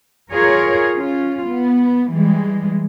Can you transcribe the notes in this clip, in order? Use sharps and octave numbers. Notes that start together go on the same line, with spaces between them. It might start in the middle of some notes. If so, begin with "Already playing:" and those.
F4 G#4 A#4 C#5
C#4 F4
B3
E3 G3 G#3